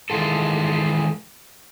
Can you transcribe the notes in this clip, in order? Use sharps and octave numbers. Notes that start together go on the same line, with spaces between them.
D#3 E3 G#3 F4 A4